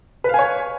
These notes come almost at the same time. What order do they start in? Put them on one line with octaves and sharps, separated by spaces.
B4 F5 G#5 C#5